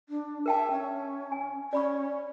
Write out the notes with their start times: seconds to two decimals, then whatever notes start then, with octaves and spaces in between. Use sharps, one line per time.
0.09 D4
0.46 A#4 E5 G5 A5
0.71 C#4
1.32 G#5
1.73 C#4 D5 B5 C#6